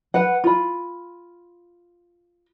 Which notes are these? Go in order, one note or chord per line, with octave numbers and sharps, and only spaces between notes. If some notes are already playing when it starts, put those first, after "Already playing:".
B4 F#5
F4 B5